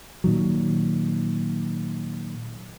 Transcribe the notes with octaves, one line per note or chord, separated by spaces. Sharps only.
A#2 D#3 F#3